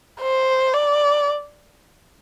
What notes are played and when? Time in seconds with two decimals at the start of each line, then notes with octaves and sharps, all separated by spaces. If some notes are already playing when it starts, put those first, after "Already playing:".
0.21 C5
0.74 D5